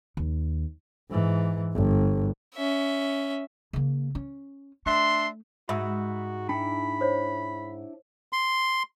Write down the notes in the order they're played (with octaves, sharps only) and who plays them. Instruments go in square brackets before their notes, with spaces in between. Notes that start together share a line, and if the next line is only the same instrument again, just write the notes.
[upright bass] D#2
[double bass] G#2 E3
G1
[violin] C#4 E5
[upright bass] C#3 A#3
C#4
[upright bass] A3 [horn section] D4 E5 C6
[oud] G#2 [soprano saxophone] F#4 [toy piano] E5 [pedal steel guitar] B5 E6
[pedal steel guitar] D4 E4 [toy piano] G5 [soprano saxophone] B5
[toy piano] C5 C#5
[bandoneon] C6